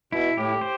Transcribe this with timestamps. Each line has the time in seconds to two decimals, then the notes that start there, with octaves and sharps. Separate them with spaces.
0.12 B2 E4
0.37 A2 G4
0.61 C5